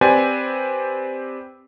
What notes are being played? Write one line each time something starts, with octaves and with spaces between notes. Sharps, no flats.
C4 G4 B4 C5 D5 G#5